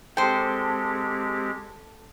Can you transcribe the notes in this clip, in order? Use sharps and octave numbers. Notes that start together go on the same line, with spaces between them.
G#3 C4 G4 A4 C5 G5